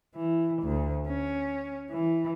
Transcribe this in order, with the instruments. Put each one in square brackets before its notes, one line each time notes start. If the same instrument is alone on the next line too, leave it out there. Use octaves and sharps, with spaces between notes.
[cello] E3
D2
C#4
E3